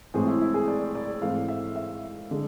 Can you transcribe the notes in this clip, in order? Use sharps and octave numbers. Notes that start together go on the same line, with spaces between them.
A2 E3 G#3 C4 G#4
E4
E4
G#4
D5
D5
G#2 E3 A3 C4 F5
E5
E5
D3 G#3